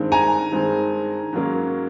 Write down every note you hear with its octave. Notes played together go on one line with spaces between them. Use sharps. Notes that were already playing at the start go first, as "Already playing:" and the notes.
Already playing: G2 D#3 G#3 C4
G#5 A#5
G2 D#3 G#3 C4
G#2 D#3 F#3 A#3 C#4